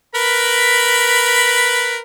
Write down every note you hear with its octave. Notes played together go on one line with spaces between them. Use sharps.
A#4 B4 B5